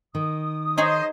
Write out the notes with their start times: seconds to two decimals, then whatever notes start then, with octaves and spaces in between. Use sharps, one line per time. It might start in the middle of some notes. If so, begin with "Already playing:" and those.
0.15 D#3 D#6
0.78 D#4 G#4 C5 C#5 D#5